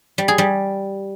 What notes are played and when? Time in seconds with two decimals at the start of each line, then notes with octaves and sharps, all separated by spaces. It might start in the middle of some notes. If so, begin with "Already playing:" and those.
0.18 G3
0.28 G#4
0.38 G3